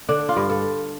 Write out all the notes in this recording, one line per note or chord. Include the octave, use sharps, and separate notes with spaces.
D3 D4
F4
G2
A4